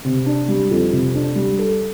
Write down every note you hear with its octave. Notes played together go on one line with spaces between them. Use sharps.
C3
D4
G3
F2
C3
D4
G3
A4